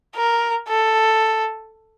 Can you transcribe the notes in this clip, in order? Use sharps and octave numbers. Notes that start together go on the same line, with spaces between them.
A#4
A4